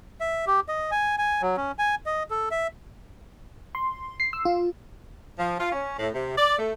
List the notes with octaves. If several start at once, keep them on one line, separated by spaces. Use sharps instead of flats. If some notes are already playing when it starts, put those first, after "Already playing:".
E5
G4
D#5
G#5
G#5
F#3
C#4
G#5
D#5
A4
E5
C6
C7
E6
F4
F3
F4
C#4
A2
C3
D5
A3